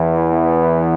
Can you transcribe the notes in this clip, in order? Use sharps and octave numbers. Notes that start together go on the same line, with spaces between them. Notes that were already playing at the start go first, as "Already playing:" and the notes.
Already playing: E2 E3
B3